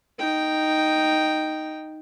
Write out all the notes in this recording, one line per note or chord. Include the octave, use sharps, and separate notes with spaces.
D#4 G5